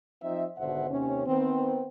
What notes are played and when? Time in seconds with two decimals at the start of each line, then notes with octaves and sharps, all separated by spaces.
0.22 F3 C4 D#4 E5
0.58 G#1 B2 D3 C5 E5 F#5
0.89 D#2 C3 C#4
1.27 D#3 B3 C4